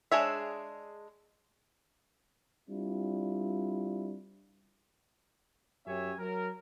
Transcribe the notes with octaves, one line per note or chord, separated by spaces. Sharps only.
G#3 D4 G#4 C#5 E5
G3 C4 D4 E4 F4
F#2 C#4 G4 C#5 E5 G#5
F#3 A#4